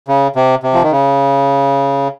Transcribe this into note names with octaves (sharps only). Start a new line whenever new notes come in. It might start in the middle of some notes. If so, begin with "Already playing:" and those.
C#3
C3
C3
F3
D#3
C#3